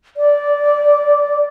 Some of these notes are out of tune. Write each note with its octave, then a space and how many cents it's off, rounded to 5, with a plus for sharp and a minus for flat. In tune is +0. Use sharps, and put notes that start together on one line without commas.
D5 -10